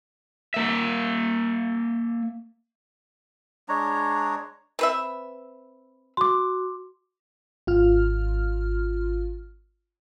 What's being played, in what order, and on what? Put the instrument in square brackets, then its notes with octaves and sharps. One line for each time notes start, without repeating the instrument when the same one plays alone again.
[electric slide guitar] A#3 E5
[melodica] G#3 D4 C#5 A#5
[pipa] C4 B4 E5
[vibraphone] F#4 [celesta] C6 D6
[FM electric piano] G#1 F4 F6